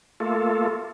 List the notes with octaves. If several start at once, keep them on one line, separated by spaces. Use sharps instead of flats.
A3 A#3 F4 A4